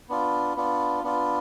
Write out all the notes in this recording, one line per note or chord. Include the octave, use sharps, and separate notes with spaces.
B3 D4 F4
B3 D4 F4
B3 D4 F4